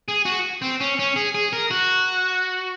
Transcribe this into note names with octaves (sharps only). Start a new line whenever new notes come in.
G#4
F#4
C4
C#4
C#4
G#4
G#4
A#4
F#4